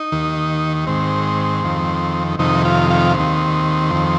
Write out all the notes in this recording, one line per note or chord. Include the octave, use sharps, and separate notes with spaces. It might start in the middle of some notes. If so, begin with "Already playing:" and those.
Already playing: D#4
D#2 D#3
G#2 D#3 C4
F2 D#3
F2 C3 D#3 D#4
F4
F4
D#2 D#3 C4
F2 D#3